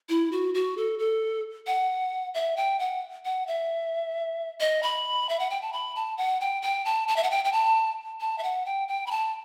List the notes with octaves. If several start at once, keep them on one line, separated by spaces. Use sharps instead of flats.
E4
F#4
F#4
A4
A4
F#5
E5
G5
F#5
F#5
E5
D#5
B5
E5
F#5
G5
A5
B5
A5
F#5
G5
G5
A5
A5
E5
F#5
G5
G5
A5
A5
E5
F#5
G5
G5
B5
A5